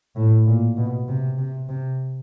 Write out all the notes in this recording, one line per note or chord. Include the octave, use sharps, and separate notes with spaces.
A2
A#2
B2
C3
C3
C3